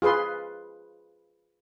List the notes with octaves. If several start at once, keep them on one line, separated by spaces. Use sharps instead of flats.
F4 G#4 B4 C6